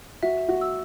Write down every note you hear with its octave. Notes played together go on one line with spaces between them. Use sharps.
F#4 E5
F#4
E6